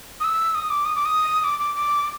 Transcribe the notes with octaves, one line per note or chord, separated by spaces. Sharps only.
D#6
E6
D#6
D6
D#6
D6
D#6
D6
D6
D6